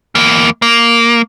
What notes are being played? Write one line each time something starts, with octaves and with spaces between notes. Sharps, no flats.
E2 A#3
A#3